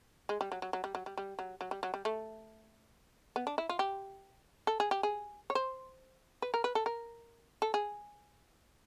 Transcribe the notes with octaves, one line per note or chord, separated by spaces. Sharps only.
G#3
G3
F#3
F#3
F#3
G3
F#3
G3
G3
F#3
F#3
G3
F#3
G3
A3
B3
D4
E4
F4
G4
A4
G#4
G4
G#4
C#5
C5
B4
A#4
B4
A4
A#4
A4
G#4